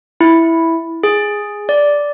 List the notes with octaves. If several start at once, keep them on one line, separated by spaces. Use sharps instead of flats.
E4
G#4
D5